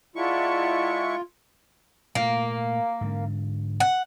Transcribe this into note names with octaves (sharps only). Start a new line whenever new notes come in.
G#3 E4 F4 D5 F#5 A5 C#6
A#2 A3 A#3
G#2 D3
F#5